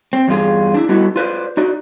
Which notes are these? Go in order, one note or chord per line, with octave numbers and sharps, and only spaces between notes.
C4
E2 G2 F4 G#4
D4 E4
G3 A3 B3 D#4 E4 F#4
F4 B4 C5 D5
D#4 F#4 D5